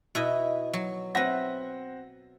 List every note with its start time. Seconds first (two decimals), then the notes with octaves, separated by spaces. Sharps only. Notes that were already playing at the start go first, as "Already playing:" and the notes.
0.15 B2 E4 D#5
0.73 F#3
1.15 C4 B4 E5 F#5 A#6